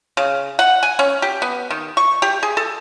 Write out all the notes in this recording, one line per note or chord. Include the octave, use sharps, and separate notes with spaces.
C#3
F#5
G#5
C#4
G4
B3
D#3
C#6
G4
G#4
A4